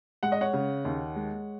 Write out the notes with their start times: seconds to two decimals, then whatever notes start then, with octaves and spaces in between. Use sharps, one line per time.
0.23 G#3 F#5
0.32 D#5
0.41 C#5 F#5
0.53 C#3
0.85 D#2
1.16 G#3